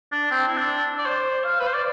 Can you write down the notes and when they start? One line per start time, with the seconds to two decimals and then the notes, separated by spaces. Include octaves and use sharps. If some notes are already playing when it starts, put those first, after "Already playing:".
0.12 D4
0.31 C4
0.48 E4
0.56 D4
0.98 D5
1.06 C5
1.44 F5
1.60 B4
1.67 C5
1.74 D5